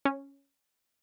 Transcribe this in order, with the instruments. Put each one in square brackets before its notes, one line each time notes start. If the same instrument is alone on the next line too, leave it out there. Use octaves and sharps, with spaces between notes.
[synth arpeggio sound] C#4